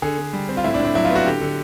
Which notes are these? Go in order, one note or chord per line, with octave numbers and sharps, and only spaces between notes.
D3 G#4
D3
G3
C4
F4
A2 E4
D4
A2
D4
F#3 E4
F4
B3
F#4
D3 G4
D3